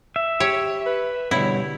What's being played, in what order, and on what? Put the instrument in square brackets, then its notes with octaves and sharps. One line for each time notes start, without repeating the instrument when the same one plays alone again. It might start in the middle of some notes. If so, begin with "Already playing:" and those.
[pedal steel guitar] E5
[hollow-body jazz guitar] G4 [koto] C#5
[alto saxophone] B4
[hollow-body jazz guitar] B2 D3 G3 [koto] E4 [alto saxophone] C#5